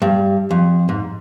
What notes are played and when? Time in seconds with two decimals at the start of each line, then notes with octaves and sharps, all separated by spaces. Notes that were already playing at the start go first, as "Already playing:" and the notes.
0.02 G2
0.51 F2
0.89 G#2